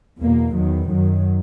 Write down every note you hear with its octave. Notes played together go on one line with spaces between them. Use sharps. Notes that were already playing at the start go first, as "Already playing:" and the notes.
E2 B2 A#3
E2 D#3 F#3
F#2 D#3 F#3